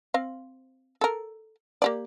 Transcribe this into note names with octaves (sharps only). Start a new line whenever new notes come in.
C4 F5
A4 A#4
A#3 G4 D5